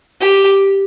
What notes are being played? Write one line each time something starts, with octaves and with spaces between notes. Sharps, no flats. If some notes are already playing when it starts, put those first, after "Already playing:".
G4